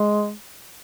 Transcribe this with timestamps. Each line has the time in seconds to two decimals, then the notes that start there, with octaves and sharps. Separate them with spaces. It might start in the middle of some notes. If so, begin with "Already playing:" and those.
Already playing: G#3